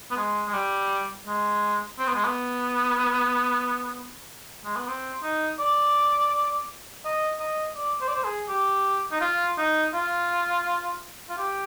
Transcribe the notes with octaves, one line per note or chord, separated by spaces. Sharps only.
B3
G#3
G#3
G3
G#3
C4
B3
G#3
B3
G#3
B3
C4
D#4
D5
D#5
D#5
D5
C5
D5
C5
G#4
G4
D#4
F4
D#4
F4
F4
G4